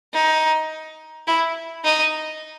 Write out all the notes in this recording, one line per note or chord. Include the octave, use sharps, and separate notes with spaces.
D#4
E4
D#4